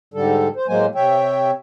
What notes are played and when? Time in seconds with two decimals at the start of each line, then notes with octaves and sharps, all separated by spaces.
0.14 G#2 D3 G3 A4
0.56 C5
0.68 A2 F#3 G#3 A#3 C5 G#5
0.95 C3 C#5 E5 G5